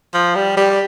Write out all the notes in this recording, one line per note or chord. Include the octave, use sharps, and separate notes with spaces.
F3
G3
G3